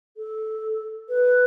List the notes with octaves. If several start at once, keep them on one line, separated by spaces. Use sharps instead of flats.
A4
B4